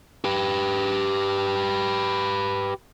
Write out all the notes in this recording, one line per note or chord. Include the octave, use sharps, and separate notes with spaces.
G4 B4